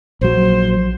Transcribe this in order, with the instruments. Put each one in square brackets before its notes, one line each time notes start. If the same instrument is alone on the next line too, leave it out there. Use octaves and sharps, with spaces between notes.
[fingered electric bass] A#1 F#3 [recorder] C5